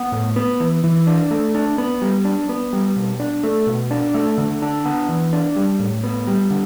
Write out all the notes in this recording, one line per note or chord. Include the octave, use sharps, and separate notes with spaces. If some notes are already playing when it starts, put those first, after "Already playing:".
Already playing: B3
A2
B3
E3
E3
D4
A3
D4
B3
G3
D4
B3
G3
B2
D4
A3
B2
D4
A3
D3
D4
B3
E3
D4
G3
A2
B3
G3
D3